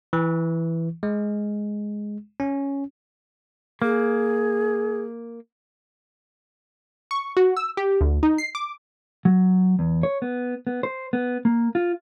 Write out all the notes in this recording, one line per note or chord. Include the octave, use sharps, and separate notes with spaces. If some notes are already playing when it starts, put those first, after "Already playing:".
E3
G#3
C#4
A#3 G#4
C#6
F#4
E6
G4
D2
D#4
C7
D6
F#3
E2
C#5
B3
B3
C5
B3
A#3
F4